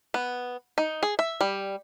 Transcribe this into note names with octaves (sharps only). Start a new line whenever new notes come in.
B3
D#4
G#4
E5
G3